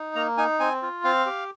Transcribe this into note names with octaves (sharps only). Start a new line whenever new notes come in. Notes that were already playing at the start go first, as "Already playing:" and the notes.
Already playing: D#4
A#3 A#5
D#4 G#5
C4 G#5
F4
C4 F5
G4